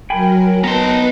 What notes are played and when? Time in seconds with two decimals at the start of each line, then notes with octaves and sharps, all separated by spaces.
0.10 F#3 A#4 G5 G#5 B5
0.64 B3 D#4 B4 A5 A#5 C6